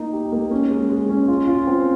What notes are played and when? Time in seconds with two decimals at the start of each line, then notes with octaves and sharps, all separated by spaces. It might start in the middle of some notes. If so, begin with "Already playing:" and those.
Already playing: A#3 D#4
0.13 G4
0.32 A#3
0.51 C#4
0.71 G#3
0.89 G#3
1.09 C#4
1.28 F4
1.48 F4
1.67 C4